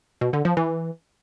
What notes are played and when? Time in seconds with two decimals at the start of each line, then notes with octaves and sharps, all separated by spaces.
0.21 B2
0.33 D3
0.45 F3
0.57 E3